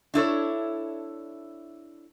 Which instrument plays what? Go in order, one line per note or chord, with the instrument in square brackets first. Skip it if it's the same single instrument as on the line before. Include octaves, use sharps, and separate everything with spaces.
[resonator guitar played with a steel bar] D4 E4 A4 C#5